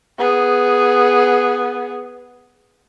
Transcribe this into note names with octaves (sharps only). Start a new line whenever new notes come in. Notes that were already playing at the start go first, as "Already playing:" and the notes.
B3 G#4